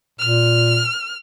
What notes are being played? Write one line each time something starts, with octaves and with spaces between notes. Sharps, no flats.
A#2 F6